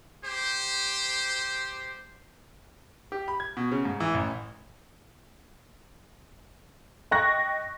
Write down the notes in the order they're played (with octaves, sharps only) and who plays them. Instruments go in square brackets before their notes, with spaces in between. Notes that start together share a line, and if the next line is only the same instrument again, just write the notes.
[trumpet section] G4 C5
[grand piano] G4
B5
G#6
B2
C#3
G#2
E3
A1
[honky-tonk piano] D#5 G5 C#6 F#6 A#6